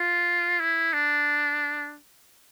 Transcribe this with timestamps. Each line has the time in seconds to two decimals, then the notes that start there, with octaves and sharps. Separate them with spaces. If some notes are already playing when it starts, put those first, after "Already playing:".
Already playing: F4
0.60 E4
0.93 D4